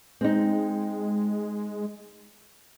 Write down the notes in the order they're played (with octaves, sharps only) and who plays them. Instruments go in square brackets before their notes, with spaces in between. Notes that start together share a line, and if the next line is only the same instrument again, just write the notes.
[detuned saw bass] G#3 [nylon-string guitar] C4 D#4